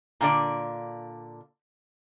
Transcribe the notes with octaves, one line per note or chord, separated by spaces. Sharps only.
A#2 D3 D5